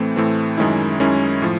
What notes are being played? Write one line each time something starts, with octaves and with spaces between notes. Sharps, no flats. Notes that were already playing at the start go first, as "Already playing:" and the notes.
Already playing: A2 E3 A3 C4
A2 E3 A3 C4
F#2 D#3 G#3 C#4 E4
F#2 D#3 G#3 C#4 E4
A2 F3